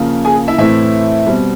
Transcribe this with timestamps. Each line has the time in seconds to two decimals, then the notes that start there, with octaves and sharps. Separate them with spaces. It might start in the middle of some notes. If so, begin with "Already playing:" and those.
Already playing: C#3 F3 A#3
0.25 G#4 G#5
0.48 E4 E5
0.58 A2 E3 A3 C4 E4 E5
1.26 B2 G3 C4